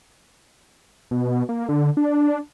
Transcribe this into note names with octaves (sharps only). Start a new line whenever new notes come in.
B2
A#3
D3
D4